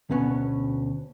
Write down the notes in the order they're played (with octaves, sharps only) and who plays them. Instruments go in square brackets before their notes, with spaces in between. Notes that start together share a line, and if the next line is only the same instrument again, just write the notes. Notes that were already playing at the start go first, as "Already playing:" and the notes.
[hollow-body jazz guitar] D2 B2 B3 C#4 C#5